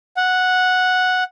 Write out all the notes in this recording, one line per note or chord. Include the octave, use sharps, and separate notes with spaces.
F#5